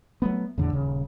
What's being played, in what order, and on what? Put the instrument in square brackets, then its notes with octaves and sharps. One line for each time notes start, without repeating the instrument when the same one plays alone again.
[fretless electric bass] F#3 A3 B3
E2 A2 D3
D#1 C#3